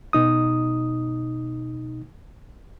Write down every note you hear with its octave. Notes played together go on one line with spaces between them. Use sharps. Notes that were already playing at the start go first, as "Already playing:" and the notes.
B2 D#4 D#6